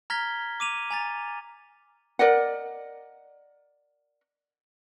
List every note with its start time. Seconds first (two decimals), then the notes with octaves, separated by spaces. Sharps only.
0.10 A#5 F6 G#6 A#6 B6 G7
0.60 D6 D#7 F7
0.90 G#5 A#5 A6
2.19 A#4 D5 D#5 F#5